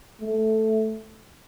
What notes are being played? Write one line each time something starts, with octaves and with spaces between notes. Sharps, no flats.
A3